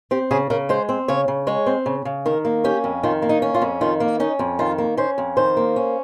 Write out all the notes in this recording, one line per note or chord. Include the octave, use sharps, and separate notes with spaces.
C4 G4
C#3 G#4
C#3 A#4
G#3 C5
C4
C#3 C#5
C#3
G#3 C#5
C4
C#3
C#3
D#3 A#4
A#3
C#4 G4
F2
D#3 F4
A#3
D#4
C#4
F4
F2
D#3 F4
A#3
C#4 D#4
F2
D#3 F4
A#3
C#4 C5
F2
D#3 C5
A#3
C#4